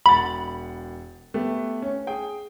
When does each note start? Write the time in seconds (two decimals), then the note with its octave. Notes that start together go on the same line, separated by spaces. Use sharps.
0.06 E1 F#5 B5 A6
1.34 A3 B3 G4
1.82 C#4
2.07 G#4 G5